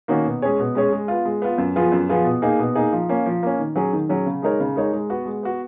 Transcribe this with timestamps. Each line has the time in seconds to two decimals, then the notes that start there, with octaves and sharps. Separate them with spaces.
0.08 D#3 A#3 C#4 F#4
0.25 B2
0.42 G#3 C#4 G#4 C#5
0.59 B2
0.75 G#3 C#4 G#4 C#5
0.92 G#3
1.08 B3 F4
1.25 G#3
1.42 B3 F4
1.58 F#2
1.76 F3 B3 F4 G#4
1.92 F#2
2.09 F3 B3 F4 G#4
2.25 B2
2.42 A#3 D#4 G#4
2.59 B2
2.75 A#3 D#4 G#4
2.93 F3
3.09 A#3 C#4
3.26 F3
3.43 A#3 C#4
3.59 D#3
3.75 F#3 C#4 G#4
3.93 D#3
4.09 F#3 C#4 G#4
4.26 C#3
4.42 G#3 D#4 A#4 C#5
4.60 C#3
4.76 G#3 D#4 A#4 C#5
4.92 G#3
5.10 B3 F#4
5.26 G#3
5.43 B3 F#4